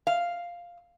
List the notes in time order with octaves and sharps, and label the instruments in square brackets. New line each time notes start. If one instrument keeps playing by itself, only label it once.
[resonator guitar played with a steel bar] F5